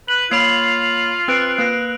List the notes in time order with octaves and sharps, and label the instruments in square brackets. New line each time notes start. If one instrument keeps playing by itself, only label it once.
[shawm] B4 [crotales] F#7
[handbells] A#3 C#5 B5 [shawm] F4 [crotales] C7 F7
[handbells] C4 B4 [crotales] E6 F#6 D7
[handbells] A#3 B4 A#6